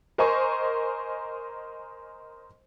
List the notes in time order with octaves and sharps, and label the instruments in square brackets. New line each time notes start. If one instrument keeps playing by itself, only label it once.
[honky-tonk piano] A#4 C5 D#5 G#5 C#6